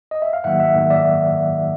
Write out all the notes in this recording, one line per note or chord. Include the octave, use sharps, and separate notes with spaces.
D#5
E5
F5
G#2 D#3 F#3 A#3 E5 F#5
E5 F#5
G#2 D#3 F#3 A#3
D5 E5